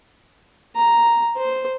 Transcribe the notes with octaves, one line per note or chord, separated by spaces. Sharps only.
A#5
C5